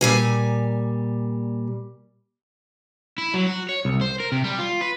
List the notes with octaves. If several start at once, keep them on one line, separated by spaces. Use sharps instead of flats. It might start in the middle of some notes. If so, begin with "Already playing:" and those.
A#2 G3 G#5
E4
F#3
F#4
C#5
C2
C5
A#4
C3
G3
F4
B4